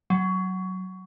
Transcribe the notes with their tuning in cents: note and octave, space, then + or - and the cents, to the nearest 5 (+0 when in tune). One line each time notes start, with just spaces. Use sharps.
F#3 +15